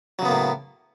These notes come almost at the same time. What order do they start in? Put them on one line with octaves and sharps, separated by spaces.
F#3 C#3 B3 A#3 A2